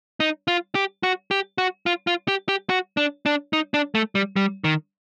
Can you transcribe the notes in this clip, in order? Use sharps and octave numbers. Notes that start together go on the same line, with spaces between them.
D#4
F4
G4
F#4
G4
F#4
F4
F4
G4
G4
F#4
D4
D4
D#4
D4
A3
G3
G3
D#3